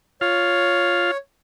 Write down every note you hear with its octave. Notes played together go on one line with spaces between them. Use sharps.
F4 C#5 F5